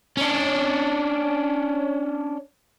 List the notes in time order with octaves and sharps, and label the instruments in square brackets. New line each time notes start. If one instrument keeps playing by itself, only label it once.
[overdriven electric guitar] C#4 D4